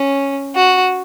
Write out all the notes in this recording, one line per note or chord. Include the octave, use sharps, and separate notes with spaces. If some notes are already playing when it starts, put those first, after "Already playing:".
Already playing: C#4
F#4